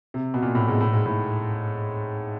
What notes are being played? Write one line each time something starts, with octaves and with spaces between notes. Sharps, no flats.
C3
B2
A#2
A2
G#2
A2
G#2
A2